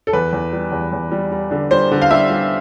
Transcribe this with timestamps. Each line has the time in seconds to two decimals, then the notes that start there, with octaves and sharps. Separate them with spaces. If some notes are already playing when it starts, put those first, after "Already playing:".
0.07 A4
0.13 E2 B4
0.33 E2
0.53 G3
0.72 E2
0.92 E2
1.12 G3
1.31 G3
1.51 D3
1.71 G3 C5
1.92 D3
2.02 F5
2.11 G3 E5
2.30 G3